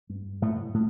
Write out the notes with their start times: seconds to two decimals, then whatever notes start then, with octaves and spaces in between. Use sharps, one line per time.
0.09 G2
0.42 A2 A3
0.74 A2